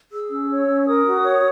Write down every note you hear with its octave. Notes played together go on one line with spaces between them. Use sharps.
G#4 E6
C#4
C#5
C#4
A#4 D#6
F#4
C#5